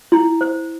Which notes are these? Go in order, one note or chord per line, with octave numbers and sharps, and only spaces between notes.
E4
C5